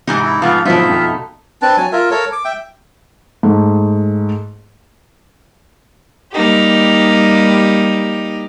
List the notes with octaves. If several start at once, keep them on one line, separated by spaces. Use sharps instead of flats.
G#2 C3 E3 D#4
E4
F2 G#2 A3 B3 F4 F5
G#2 B2 F3 F#3 A3 D#4 F4 E5
F2 F6
C4 D4 B4 A5
F#3 G#5
F4 A#4 E5
A4 A#4 C#5
D6
E5 G5
G#2 A3
G3 A#3 D#4 G4